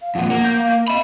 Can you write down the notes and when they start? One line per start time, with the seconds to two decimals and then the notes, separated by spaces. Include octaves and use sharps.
0.02 F5
0.15 F2 A#2 F#5
0.30 A#3
0.44 G6
0.57 F5
0.88 D#5 E5 B5